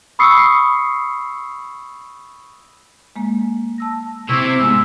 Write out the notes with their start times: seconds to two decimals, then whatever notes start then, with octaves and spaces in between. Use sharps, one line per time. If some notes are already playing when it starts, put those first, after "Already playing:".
0.19 B5 C#6 D#6 E6 C7 C#7
3.16 G#3 A#3
3.78 A5 E6 A#6
4.29 C3 C4 E4 C#6 D6
4.61 G#2 B3 D#4 E6